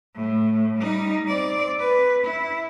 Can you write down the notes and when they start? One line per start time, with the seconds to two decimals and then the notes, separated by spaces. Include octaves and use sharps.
0.16 A2
0.78 G3 D#4
1.28 C4 D5
1.80 B4
2.24 E4